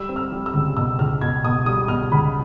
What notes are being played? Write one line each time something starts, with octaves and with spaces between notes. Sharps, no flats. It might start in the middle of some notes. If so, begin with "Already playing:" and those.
Already playing: G3 E6
C4
F6
G3
E6
C#2
B2 E6
C#2 F6
B2 G#6
B2 D#6
G3 D#6
B2 F6
C#2 B5